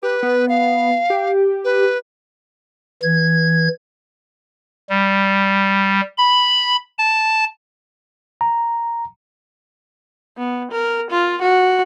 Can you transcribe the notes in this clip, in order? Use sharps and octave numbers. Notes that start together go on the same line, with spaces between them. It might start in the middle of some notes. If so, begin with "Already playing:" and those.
G4 B4
B3
F5
G4
B4
E3 G#6
G3
B5
A5
A#5
B3
A#4
F4
F#4